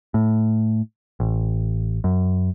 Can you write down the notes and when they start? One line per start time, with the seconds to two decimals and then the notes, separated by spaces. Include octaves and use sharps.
0.14 A2
1.20 A1
2.04 F#2